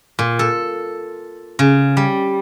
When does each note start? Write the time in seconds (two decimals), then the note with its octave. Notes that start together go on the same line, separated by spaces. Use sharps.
0.19 A#2
0.39 A4
1.59 C#3
1.97 G3